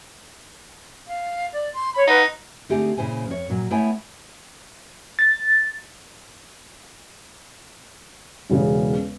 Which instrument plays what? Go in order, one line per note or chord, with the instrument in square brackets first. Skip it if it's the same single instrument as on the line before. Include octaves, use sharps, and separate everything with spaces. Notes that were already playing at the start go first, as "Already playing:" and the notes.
[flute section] F5
D5
C6
C#5 B5
[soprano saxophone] D#4 [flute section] F4 B4 F#5
[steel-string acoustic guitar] D3 A3 C4 D#4 G4 G#4
A#2 C#3 E4 C5 G#5
F2 C#5
A#2 F#3
A3 B3 E4 C#5 G5 G#5
[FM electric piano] A6
[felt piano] E1 E2 C#3